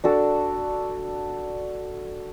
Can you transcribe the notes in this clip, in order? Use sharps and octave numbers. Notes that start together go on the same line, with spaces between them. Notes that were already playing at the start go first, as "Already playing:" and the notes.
D4 F#4 A4